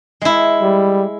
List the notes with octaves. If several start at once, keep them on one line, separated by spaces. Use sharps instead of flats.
G#3 E4
G3